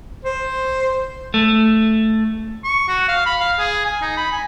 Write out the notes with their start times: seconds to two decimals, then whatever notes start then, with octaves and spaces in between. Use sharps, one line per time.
0.25 C5
1.34 A3
2.64 C#6
2.88 F#4
3.08 F5
3.26 B5
3.40 F5
3.59 G#4
3.85 G#5
4.02 D#4
4.17 B5
4.32 G#5